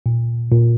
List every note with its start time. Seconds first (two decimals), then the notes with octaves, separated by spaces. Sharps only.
0.06 A#2
0.51 A#2